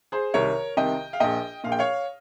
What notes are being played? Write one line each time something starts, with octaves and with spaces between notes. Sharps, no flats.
G#4 C5
C2 C3 D#3 A#4 C#5
C2 C3 D#3 D#5 G5
F5
A#1 A#2 D#5 G5
A#1 A#2 F5
G5
C#5 F5